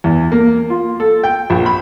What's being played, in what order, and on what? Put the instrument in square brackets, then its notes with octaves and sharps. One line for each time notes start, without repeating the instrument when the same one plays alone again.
[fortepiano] E2
A#3
F4
A4
G5
A#1
B5